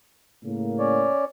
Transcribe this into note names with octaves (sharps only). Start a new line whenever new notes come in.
A2 C#3 A#3
C#4 C#5 D5